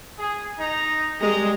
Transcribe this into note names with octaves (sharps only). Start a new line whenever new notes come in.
G#4
D#4 A#5
G3 G#3 D#5 A#5